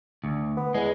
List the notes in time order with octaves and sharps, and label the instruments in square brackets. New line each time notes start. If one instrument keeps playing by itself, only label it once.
[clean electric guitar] D2
[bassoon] B3
[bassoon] E2 [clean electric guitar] G#3